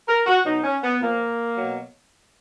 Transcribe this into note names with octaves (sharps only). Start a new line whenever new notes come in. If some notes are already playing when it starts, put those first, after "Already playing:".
A#4
F#4
B2 F#3 D#4
C#4
B3
A#2 F3 A#3
B2 F#3